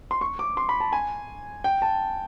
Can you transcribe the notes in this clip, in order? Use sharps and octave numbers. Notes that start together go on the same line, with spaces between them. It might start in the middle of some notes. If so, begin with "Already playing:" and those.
C6
C#6
D6
C6
B5
A5
G#5
G5
A5